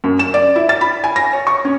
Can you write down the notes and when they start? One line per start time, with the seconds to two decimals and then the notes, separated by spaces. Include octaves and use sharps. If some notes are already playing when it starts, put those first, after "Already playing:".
0.04 F#2
0.19 E7
0.34 D5
0.56 E4
0.69 A6
0.81 B5
1.04 G#5
1.16 A#6
1.33 C#5
1.47 C#6
1.65 C#4